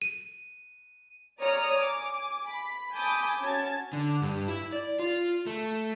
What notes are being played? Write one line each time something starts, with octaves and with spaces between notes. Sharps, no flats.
D#7
C#5 D5 A#5 D#6 F6
G#5 D6
B5
G#5 A5 B5 D6 D#6 G6
C#4 F#4 A5 G#6 A6
D3
G2
E4
D5
F4
A3